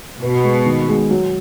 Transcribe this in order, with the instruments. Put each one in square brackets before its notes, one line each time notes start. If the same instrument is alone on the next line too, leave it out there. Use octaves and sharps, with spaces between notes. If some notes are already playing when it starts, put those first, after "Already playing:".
[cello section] B2 [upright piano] B4
[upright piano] G#3
D#3
G#3
F#3